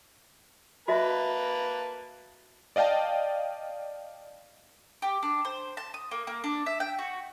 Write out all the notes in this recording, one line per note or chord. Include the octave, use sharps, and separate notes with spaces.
A#3 F#4 B4 D#5 E5 A5
D5 D#5 F5 G5 A5
G4
D4
C5
A5
D#6
A#3
A#3
D4
E5
G5
F#4